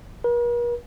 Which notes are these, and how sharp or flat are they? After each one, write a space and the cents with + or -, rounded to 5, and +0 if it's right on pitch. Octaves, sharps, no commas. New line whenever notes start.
A#4 +45